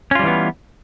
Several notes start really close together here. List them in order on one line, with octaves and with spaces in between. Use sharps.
C#4 F4 G3 E3 B3